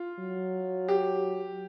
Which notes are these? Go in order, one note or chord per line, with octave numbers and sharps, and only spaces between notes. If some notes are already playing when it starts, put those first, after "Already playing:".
Already playing: F4
F#3
G4